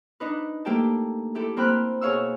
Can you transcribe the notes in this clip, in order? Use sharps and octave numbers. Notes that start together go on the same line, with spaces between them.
D4 D#4 B4
A3 A#3 G4 G5 A5
E4 G4 A4
A#3 C4 G5 B5 F6 F#6
B2 G#4 C#5 F5 C#6 E6